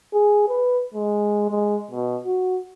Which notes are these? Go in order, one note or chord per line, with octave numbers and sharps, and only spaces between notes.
G#4
B4
G#3
G#3
B2
F#4